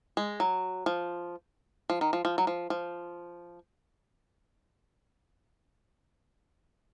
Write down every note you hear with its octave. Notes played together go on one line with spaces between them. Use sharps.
G#3
F#3
F3
F3
D#3
F3
F3
F#3
F3
F3